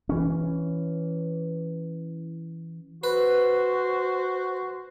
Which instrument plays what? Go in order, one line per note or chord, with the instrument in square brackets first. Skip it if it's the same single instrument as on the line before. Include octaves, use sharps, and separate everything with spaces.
[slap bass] E3 C#4
[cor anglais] F#4 [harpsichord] B4 [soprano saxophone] C5